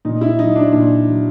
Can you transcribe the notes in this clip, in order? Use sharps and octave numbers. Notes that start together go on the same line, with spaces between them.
A#2 D#4
E4
F#3 D#4
D4
A#2 D4
F#3